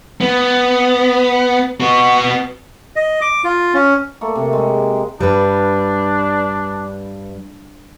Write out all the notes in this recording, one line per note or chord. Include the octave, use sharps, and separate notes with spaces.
B3
B3 F#4
D#5
D6
F4
C#4
A3 A#3
C3
G#3
G2 G3 D4 B4